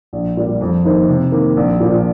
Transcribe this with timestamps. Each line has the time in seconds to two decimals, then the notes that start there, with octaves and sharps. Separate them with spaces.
0.13 A#1
0.37 A#2 G3
0.61 F2
0.85 D#3 A#3 D#4 C5
1.09 C3
1.32 D#3 A#3
1.57 A#1
1.80 A#2 F3